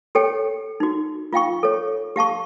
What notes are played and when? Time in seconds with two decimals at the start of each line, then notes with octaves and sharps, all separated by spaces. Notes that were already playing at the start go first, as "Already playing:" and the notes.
0.15 G4 A4 C#5 G5
0.80 D#4 F#4
1.33 F4 F5 G5 C#6
1.63 A4 C#5
2.16 G4 F5 A5 C#6